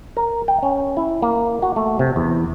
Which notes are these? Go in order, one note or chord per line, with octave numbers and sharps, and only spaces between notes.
A#4
G5
C#4
E4
A#3
F#4
A3
C3
E2